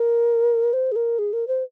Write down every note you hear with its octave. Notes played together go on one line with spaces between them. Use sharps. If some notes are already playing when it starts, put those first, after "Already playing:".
Already playing: A#4
C5
G#4
A#4
G#4
A#4
C5